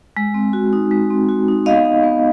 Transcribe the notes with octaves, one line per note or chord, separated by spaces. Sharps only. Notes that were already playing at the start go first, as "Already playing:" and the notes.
G#3
C4
F#4
D#4
G#3
C4
F#4
D#4
B3 D#5 F5
D#4
B3